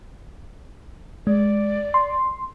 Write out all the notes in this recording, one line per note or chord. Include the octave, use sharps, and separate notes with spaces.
G#3 D5
C6